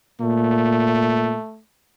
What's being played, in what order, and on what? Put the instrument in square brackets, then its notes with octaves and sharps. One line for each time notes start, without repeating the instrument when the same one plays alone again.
[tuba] A#2 [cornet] A3